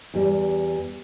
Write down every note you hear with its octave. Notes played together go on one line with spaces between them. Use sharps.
E2 G3